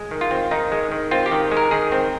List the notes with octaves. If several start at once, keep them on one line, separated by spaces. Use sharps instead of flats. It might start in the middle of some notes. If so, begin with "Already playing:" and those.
Already playing: G#3
D#3
F4
C4
D#3 D#4
G#3
D#3
C4 F4
G4
D#3
G#3
A#4
D#3 G#4
C4